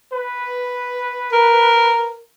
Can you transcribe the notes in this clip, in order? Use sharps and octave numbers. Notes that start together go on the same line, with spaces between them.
B4
A#4